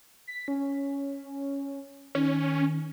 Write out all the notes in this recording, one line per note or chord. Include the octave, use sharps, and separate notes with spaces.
B6
C#4
D#3 C#4